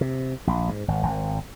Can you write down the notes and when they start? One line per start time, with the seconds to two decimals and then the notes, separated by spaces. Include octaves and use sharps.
0.01 C3
0.47 A#1
0.69 G#2
0.88 G#1
1.03 G#1